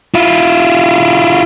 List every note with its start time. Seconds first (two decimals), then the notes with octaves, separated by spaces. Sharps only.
0.14 E4 F4